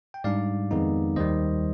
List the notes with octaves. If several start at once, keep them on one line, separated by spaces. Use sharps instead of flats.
G5
G#2 G3 D4 D5 F5
F2 D#3 G#3 B3 D#4
D#2 D#3 G3 C5 D#5